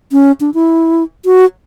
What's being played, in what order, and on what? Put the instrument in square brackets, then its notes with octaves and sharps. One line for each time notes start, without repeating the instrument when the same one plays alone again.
[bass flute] C#4
D4
E4
F#4